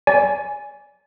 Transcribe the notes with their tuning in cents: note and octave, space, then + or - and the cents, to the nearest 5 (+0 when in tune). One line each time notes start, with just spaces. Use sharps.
D5 -25 G#5 +0